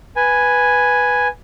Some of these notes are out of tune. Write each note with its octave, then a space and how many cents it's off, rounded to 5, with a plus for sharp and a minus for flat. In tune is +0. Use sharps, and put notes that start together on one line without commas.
B4 +0 G#5 +0